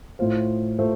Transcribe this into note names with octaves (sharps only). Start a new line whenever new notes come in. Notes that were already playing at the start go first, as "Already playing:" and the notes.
A2 A3 F4 C5
A2 A3 F4 C5